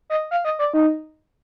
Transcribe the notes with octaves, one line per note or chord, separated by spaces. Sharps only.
D#5
F5
D#5
D5
D#4